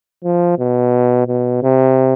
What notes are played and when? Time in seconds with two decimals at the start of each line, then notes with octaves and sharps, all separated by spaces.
0.24 F3
0.58 B2
1.27 B2
1.63 C3